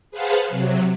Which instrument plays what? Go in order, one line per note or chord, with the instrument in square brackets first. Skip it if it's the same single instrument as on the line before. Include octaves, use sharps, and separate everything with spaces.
[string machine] G#4 B4 C5 F5 F#5 A5
C3 F#3